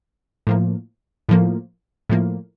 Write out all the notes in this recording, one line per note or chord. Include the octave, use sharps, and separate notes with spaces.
A2 F3 A#3
A2 F3 A#3
A2 F3 A#3